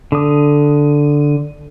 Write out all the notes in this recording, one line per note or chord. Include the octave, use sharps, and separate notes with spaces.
D3 D#6